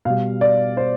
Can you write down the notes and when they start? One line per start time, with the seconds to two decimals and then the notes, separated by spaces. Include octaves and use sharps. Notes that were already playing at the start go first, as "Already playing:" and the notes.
0.05 B2 G3 F5
0.41 D5
0.77 C5